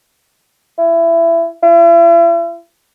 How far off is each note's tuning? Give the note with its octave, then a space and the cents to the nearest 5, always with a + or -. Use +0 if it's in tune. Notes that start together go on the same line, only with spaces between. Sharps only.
E4 +25
E4 +45